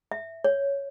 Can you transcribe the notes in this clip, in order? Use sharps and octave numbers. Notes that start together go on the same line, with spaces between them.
E5
C#5